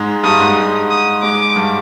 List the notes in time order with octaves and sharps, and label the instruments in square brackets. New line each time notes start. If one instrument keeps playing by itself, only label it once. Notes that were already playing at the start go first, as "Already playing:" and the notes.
Already playing: [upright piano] G#2 G#3
[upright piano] G2 G3 [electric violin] D#6
[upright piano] G#2 G#3
[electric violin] D#6
[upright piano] G#2 G#3 [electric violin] D6
[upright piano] G2 G3